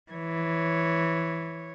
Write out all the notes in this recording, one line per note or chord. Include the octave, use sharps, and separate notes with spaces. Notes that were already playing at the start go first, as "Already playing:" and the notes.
E3 C#5